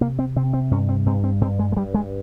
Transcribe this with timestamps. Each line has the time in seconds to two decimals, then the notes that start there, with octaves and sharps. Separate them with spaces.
0.01 C3 A#3
0.19 C4
0.36 C3 C4
0.53 C4
0.71 G2 C#4
0.89 C4
1.06 G2 C4
1.24 C4
1.41 G2 C4
1.59 G#3
1.72 G#3
1.77 G2 G3
1.94 G#3